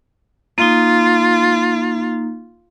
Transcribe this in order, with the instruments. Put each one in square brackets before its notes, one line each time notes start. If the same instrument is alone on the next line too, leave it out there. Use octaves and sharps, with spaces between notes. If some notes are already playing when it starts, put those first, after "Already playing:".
[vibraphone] A#3 D#4 [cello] F4